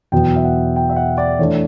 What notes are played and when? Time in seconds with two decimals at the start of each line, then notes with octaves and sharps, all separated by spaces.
0.12 E2 B2 F#3 B3 G5
0.36 E5
0.45 F#5
0.76 G5
0.90 E5
0.96 F#5
1.18 D5
1.39 E3 A3 D4 C#5